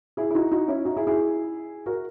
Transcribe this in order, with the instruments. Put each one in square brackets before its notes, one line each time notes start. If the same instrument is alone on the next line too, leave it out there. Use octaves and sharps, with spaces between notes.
[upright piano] E4 G#4
E4
D#4 F#4
D#4 F#4
C#4 E4
D#4 F#4
E4 G#4
E4 G#4
F#4 A#4